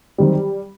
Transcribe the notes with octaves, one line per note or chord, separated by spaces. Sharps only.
D#3 F#3 G3 C4